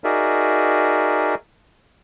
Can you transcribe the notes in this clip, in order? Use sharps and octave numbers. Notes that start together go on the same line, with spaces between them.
D#4 F#4 G#4 A#4 D5 E5